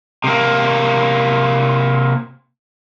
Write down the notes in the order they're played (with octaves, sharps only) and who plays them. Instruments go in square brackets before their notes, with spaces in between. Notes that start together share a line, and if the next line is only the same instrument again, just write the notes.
[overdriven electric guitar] C3 A#3